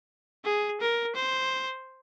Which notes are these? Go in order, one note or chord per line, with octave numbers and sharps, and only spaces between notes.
G#4
A#4
C5